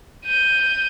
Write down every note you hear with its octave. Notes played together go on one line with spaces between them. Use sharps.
G6 D#7